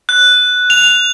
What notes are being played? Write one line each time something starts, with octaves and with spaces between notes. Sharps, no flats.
F#6
F7